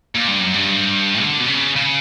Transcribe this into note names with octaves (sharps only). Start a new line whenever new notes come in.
A#2
G2
F#2
G2
D3
B2
C#3
C#3